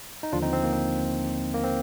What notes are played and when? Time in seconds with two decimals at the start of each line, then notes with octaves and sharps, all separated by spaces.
0.23 D#4
0.32 D#2 D3 F3 D4 F4
0.42 C4 D#4
0.53 C4
0.63 A#3
0.73 C4
1.54 A#3
1.63 C4